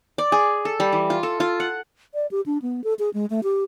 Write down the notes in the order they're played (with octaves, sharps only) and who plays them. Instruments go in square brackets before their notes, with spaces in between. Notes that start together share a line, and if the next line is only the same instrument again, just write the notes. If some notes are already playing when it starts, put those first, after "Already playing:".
[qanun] D5
G#4
A4
G3
E3
F4
A4
F4
F#5
[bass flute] D5
G4
D4
B3
A4
G#4
G#3
A3
G4